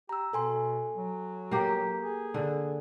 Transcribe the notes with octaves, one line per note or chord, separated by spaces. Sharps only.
G4 A#5 E6
B2 A4 G#5 C6
F#3
A#3 G4
G#4
D3